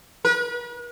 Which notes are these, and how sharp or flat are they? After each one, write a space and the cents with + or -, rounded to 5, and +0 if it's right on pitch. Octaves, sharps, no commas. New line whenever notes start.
B4 -45